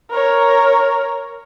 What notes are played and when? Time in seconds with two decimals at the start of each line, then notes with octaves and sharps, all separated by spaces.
0.10 A#4 C#5